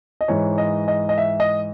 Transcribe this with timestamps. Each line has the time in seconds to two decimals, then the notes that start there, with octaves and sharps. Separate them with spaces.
0.21 D#5
0.28 G#2 E3 C#5
0.58 D#5
0.88 D#5
1.09 D#5
1.18 E5
1.40 D#5